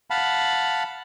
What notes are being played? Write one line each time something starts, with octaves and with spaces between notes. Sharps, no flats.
F5 F#5 A5 B5